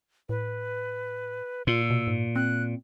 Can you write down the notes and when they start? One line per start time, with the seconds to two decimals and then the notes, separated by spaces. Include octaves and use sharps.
0.29 A2 B4
1.67 A#2 F4 E6
1.90 B2
2.07 G#2
2.36 C4 F#6